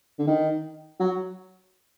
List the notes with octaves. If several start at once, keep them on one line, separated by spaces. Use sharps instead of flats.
D3
D#3
F#3